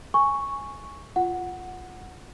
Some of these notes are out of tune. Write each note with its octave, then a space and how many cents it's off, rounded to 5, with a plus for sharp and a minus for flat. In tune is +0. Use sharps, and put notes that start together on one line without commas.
G#5 +0 C#6 +0
F4 +0 F#5 -5